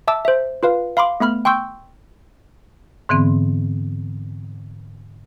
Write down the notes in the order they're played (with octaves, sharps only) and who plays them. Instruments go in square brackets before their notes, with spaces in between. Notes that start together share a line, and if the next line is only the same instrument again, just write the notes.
[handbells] E5 A5 D6 E6
C5 E5
F4 B4 F5
F5 B5 C6 D6
A3 B3 B5 F6
G5 C6 C#6 E6 G6
[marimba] G#2 D3 E3 B3 C4